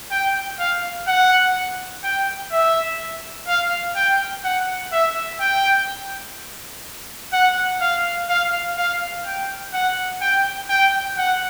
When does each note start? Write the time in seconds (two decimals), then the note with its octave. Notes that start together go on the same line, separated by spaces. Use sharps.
0.11 G5
0.59 F5
1.08 F#5
2.04 G5
2.52 E5
3.48 F5
3.96 G5
4.44 F#5
4.92 E5
5.41 G5
7.33 F#5
7.81 F5
8.29 F5
8.78 F5
9.25 G5
9.73 F#5
10.22 G5
10.70 G5
11.18 F#5